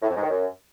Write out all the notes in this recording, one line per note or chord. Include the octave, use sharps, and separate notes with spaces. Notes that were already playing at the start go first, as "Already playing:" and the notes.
A2
F2
G#2
D#3
F#2